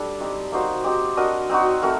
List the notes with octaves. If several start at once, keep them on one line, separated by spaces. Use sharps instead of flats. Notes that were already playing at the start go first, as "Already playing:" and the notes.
Already playing: G3 D4 A4
C4 D#4 G4
A#3 D#4 F#4 C5
C4 D#4 G4
D4 F#4 A#4 D#5
C4 D#4 F#4
A3 C4 F#4 A#4